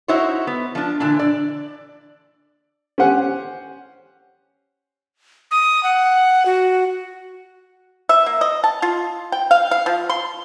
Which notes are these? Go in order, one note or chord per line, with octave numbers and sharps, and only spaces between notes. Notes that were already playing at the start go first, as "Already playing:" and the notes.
D#4 E4 F#4 C5 C#5
B3
F3 D4
A#2 D3 E3 D4
D5
C#4 G4 C5 F#5 G#5
D#6
F#5
F#4
E5
A#3
D#5
A5
F4
G5
F5
F5
F3
C6